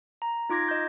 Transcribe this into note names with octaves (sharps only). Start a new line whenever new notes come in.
A#5
D#4 F4 D6 G#6 A#6
D#5 G6